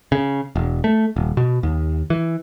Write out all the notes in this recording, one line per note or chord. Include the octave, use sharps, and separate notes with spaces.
C#3
E1
A3
D#1
B2
D#2
E3